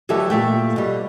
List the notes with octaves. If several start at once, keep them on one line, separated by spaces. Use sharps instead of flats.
D2 E3 F#3 G4 A4 E5
A#2 A3 G5
B2 G3